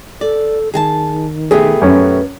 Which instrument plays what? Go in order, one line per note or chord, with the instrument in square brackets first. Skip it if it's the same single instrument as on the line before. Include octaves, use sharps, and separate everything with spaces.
[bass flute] A4 [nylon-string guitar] D5
[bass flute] D#3 [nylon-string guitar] G#4 G#5 A5
[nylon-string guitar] B2 A3 G4 [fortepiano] G#4
[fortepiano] F#2 C#4 [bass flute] B4